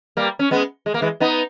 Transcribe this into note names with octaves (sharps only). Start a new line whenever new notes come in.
G3 A#3
C#4
G#3 B3
G#3
A#3
E3 G#3
B3 D#4